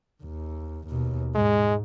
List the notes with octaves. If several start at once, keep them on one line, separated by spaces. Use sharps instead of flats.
D#2
D#2 B2
G#2 G#3